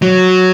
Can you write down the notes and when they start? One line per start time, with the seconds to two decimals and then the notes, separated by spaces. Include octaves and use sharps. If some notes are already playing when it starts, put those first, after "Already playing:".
0.02 F#3